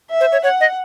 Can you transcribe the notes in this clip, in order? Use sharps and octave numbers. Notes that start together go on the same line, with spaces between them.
E5
C5
C#5
C#5 F#5
D#5